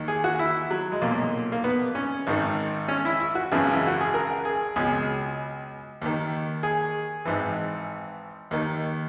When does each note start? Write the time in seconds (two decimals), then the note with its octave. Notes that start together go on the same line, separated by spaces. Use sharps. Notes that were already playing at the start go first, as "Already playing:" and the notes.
Already playing: D#2 D#3
0.08 G#4
0.24 F#4
0.39 E4
0.71 F#3
0.92 G#3
1.02 B1 A#2 A#3
1.52 A#3
1.64 B3
1.95 C#4
2.27 G#1 G#2 D#3
2.88 C#4
3.05 E4
3.20 E4
3.35 F#4
3.52 G#1 F#2 C#3 E3 G#4
3.74 E4
3.87 F#4
4.01 G#4
4.14 A#4
4.45 G#4
4.76 C#2 B2 G#4
6.02 D#2 D#3
6.63 G#4
7.25 G#1 G#2 E3
8.51 D#2 D#3